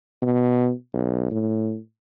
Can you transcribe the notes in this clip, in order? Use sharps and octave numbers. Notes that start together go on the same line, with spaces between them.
B2
B1
A2